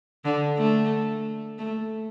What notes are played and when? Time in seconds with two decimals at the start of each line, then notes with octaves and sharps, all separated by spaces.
0.25 D3
0.58 A3
1.59 A3